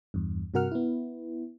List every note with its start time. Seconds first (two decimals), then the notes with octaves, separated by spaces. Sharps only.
0.14 E2 G2
0.54 G2 C3 F#4 A#4 F#5 F6
0.71 B3 E4